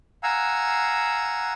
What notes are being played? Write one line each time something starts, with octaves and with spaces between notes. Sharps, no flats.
F5 F#5 G#5 A#5 E6